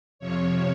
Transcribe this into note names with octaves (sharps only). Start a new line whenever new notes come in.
F2 C3 F3 C#5